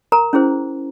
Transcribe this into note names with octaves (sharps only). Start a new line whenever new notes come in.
A#4 A#5
C#4 E4 G#4 C5